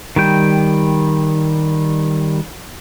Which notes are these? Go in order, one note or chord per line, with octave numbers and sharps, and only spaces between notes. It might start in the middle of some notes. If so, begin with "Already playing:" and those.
D#3 G3 G5